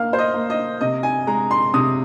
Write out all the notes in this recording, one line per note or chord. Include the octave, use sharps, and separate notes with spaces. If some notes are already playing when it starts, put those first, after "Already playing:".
Already playing: A#3 F5 F6
C5
D#5
A#3
D#5
C3 D#5
G#5
G#3 A#5
C6
C3 D#6